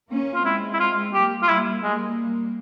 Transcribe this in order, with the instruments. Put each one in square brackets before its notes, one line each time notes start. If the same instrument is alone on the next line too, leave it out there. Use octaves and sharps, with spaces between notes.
[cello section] A#3 C#4
[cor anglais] F4
[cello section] G#3 C4 [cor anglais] E4
[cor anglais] E4
F4
[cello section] G3 A#3 [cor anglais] G4
[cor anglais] F4
[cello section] G3 A#3 [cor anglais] E4
[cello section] G3 A#3 [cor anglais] G#3